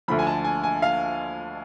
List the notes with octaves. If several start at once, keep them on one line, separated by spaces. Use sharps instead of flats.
D2 D3 F3 B5
G#5
A5
G#5
G#5
F5